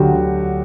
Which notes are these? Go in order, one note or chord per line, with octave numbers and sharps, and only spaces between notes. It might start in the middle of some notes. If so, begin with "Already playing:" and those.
Already playing: D2 D3 F#3 F#4 G4
D2